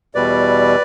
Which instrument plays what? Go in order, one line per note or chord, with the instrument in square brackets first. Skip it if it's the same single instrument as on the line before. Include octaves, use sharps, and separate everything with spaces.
[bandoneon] E2 B2 G3 B4 D5